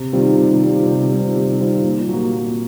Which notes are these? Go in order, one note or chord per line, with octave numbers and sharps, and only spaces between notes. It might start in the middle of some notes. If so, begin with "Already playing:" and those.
Already playing: C3
D#3 G3 C4 F4
C3
D#3 G3 C4 F4
C3
D#3 G3 C4 F4
C3
D#3 G3 C4 F4
A#2
F#3 A#3
A#2